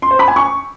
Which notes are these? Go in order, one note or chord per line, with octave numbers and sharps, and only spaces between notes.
C6
C5
B5
G#5
C#6